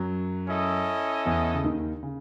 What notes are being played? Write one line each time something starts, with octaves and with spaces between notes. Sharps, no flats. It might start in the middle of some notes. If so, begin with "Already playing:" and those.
Already playing: F#2 F#3
C#4 E4 A4 D#5
E2 E3
C#3
D#2 D#3
C#3